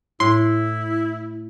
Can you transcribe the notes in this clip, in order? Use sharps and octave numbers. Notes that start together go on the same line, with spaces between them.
A2 E4 C6